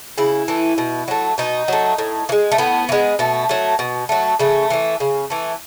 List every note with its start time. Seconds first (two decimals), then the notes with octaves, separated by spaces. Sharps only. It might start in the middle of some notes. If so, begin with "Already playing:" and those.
0.18 C#3 E4
0.48 E3 A3
0.78 B2
1.08 F#3 A3
1.38 B2 D#4
1.68 F#3 A3
1.98 A2
2.29 E3
2.32 G#3
2.52 A3
2.58 A2 B3
2.89 E3
2.92 G#3
3.19 B2 A3
3.49 F#3 A3
3.79 B2
4.09 F#3 A3
4.39 C#3 A3
4.70 E3 A3
5.00 C#3
5.30 E3 A3